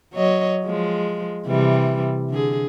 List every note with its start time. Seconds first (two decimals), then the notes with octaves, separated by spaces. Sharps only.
0.13 F#3 C#5 D#5
0.65 F3 G#3
1.46 C3 E3 G3
2.30 D3 G#4